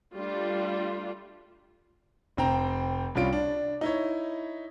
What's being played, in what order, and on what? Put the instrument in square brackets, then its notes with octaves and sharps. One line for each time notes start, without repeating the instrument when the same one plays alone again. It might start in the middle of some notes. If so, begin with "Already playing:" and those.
[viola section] G3 A3 D4 F4
[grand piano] F1 C4 G5 A#5
C2 G3 C#4 F4 D7
D4
D#4 E4 C#5